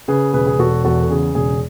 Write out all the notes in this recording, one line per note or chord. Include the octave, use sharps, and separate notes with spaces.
C#3 G#4 B4
E1 G#4 B4
G#4
E1 F#4 A4
E2 F#4 A4
A4
C#3 G#4
E1 G#4